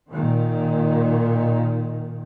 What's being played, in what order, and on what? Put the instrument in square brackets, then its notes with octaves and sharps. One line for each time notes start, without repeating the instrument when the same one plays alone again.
[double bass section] A#2 D#3